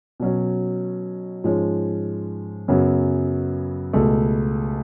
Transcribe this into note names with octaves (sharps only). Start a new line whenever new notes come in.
B2 F#3 C#4
G#2 F3 G#3 C#4
F#2 C#3 F#3 B3
C#2 B2 A3